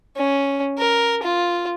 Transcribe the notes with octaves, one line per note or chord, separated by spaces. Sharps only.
C#4
A#4
F4